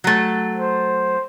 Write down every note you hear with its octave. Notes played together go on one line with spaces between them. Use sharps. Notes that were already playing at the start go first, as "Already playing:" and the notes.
F#3 A3
C5